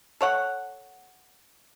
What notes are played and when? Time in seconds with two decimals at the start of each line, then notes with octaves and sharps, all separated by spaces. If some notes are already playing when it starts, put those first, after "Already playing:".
0.21 A4 C#5 F#5